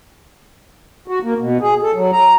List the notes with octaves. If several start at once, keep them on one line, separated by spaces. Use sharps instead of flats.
F#4
A#3
B2
G#4
A4
F#3
A#5